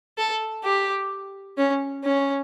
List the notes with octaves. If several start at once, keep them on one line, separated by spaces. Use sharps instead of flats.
A4
G4
C#4
C#4